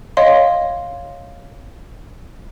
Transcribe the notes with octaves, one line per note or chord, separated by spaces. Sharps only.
C#5 D#5 F5 C6